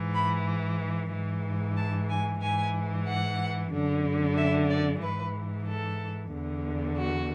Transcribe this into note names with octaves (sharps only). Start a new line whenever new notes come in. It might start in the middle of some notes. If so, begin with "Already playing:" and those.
Already playing: G#2 E3
B5
G#2 E3
A5
G#5
G#2 E3 G#5
F#5
F#2 D3
E5
D5
G#2 E3 B4
A4
E2 D3
F#4